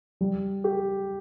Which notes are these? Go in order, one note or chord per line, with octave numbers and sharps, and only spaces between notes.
G3
G4